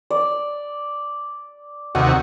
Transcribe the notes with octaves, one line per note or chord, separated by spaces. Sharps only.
D5
D#2 C3 F#4 D#6